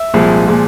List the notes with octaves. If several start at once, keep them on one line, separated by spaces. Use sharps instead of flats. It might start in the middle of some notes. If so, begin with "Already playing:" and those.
Already playing: E5
C2 A#2 F3 G#3
A#2 F3 G#3